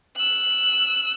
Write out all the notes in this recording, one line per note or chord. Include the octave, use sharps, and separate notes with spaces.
E6 F#6